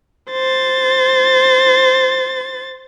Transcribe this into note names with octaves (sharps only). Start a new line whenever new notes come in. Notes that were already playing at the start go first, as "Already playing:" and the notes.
C5 A6